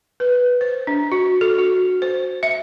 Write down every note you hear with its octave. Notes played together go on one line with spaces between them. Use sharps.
B4
C5
D4
F#4
A4
F#4
C5
E5